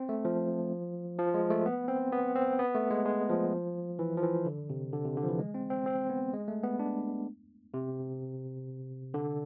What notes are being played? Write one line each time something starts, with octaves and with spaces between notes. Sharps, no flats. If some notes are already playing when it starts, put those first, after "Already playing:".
Already playing: C4
A3
F3
F3
G#3
A3
B3
C4
B3
C4
B3
A3
G#3
G#3
F3
E3
F3
E3
D3
C3
D3
C3
D3
F3
E3
G#3
C4
C4
C4
B3
G#3
A3
B3
D4
C3
D3